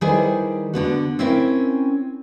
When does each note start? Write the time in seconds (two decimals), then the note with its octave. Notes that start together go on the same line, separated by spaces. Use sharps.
0.01 D#3 G3 E4 G#4 B4 C5
0.74 D3 B3 F#4
1.19 C4 C#4 E4 A#4